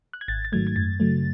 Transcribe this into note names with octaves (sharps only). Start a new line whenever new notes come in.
F#6
G#6
G#1 A6
A6
G#2 D#3 F#3 A3 G#6
G#6
F#2 A6
C#3 F#3 A3